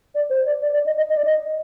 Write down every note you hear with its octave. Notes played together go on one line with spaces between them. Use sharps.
D5
C5
D5
D5
D5
D#5
D#5
D#5
D5
D#5